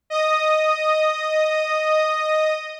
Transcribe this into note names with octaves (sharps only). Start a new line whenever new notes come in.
D#5 D#6